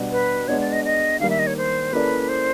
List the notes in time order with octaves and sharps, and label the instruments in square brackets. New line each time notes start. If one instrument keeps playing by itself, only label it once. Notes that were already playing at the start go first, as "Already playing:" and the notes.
Already playing: [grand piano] B2 G3 B3 D4 F#4
[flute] B4
[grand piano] G#3 B3 D4 [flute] C#5
[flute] D5
D#5
D#5
[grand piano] D#3 G3 A#3 [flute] F5
[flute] E5
D#5
C#5
C5
[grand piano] A#3 C#4 E4 A4 D5 [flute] B4
[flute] C5